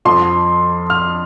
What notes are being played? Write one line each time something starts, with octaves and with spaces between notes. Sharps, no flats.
F2 F3 C6
F6